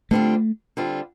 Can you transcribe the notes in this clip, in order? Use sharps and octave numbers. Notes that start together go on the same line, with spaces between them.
D3 G3 A3 C4 F4
D3 G3 C4 F4